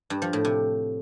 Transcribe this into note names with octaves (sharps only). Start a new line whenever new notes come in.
G2
F3
A2
C3